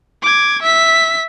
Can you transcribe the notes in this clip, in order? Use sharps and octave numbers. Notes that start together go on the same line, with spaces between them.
D6 G#6
E5 B6